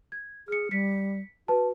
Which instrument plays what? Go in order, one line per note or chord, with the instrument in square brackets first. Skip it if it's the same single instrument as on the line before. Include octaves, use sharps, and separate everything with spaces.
[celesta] G#6
[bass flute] G#4 [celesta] F6 C#7
[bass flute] G3 [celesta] B6 C#7
[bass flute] F#4 [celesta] B4 A5